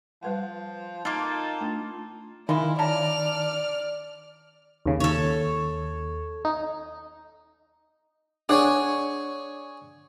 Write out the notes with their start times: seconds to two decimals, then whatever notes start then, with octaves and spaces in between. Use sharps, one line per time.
0.23 F3 G3 B4 F#5
1.05 A#3 D#4 F4 A4 D#5
1.61 A3 D4 F4
2.49 D#3 E3 G#3 E4 F4
2.79 C#3 D5 A5 A#5 F6
4.86 D#2 C#3
5.00 D#2 A4 C#5
6.45 D#4
8.49 D4 G#4 C#5 D5 F#5 G#5